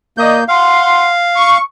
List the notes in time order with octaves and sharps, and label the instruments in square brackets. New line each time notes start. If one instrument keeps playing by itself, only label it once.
[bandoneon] A#3 G6 [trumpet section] D5 D#5
[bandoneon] F5 [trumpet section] F#5 C6
[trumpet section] C#6